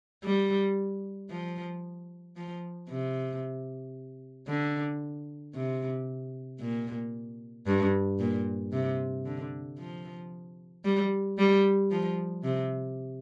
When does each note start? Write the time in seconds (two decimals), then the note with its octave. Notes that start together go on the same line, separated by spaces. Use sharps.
0.24 G3
1.30 F3
2.37 F3
2.89 C3
4.48 D3
5.55 C3
6.60 A#2
7.67 G2
8.19 A#2
8.73 C3
9.25 D3
9.79 F3
10.85 G3
11.38 G3
11.91 F3
12.44 C3